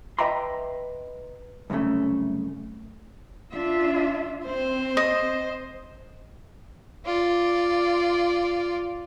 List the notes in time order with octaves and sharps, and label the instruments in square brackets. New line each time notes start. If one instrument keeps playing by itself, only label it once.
[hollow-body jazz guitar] B4 D#5 E5 G5 A#5 C6
C2 F#2 A#2 C#3 A3
[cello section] D4 F4 E5
[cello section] C4 [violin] C5
[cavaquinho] D#5
[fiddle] F4 D5